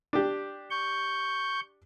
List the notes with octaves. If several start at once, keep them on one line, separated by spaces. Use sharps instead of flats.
D4 G4
C#6 G6